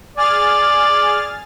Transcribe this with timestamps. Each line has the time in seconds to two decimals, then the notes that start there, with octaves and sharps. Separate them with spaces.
0.17 G#4 D5 F6 A6